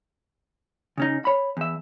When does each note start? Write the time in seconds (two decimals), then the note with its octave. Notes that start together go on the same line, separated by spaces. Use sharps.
0.98 C#3 C#4 D#4
1.25 C#5 B5
1.57 E2 E5